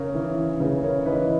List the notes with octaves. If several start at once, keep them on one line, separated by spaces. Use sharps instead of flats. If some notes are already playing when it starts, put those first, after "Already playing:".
Already playing: C#3 A#4 C#5
E3
C#3 G#4 B4
A#4 C#5
E3 B4 D#5